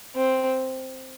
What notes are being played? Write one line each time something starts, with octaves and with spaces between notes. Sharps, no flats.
C4